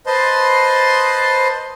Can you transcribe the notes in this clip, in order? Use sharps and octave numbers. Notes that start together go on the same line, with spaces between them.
B4 C5 D#5 A5 C6